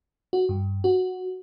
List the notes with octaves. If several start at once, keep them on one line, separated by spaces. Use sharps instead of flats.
F#4
G2
F#4